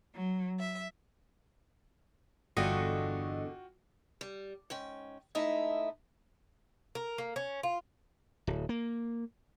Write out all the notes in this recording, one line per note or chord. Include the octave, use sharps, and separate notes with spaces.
F#3
E5
G1 E2 D3 F4 F#4 D#5 G5 C#6
G3
G#2 C#4 G5
G#3 A3 D#4 E4 D#5 E5
A#4
A#3
C#4
F4
D1
A#3